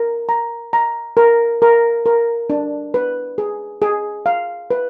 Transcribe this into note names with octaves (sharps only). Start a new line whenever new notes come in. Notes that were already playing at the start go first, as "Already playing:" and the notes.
Already playing: A#4
A#5
A#5
A#4
A#4
A#4
D4
B4
G#4
G#4
F5
B4